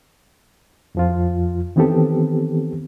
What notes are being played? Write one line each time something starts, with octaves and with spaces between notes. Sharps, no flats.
F2 F3 F4
D#3 E3 B3 C4 G4 A4